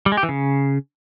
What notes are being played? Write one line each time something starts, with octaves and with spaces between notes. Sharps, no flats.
G3
G#3
G4
E3
C#3